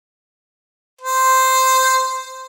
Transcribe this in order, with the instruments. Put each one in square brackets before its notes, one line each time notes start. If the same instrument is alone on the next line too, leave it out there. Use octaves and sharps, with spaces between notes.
[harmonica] C5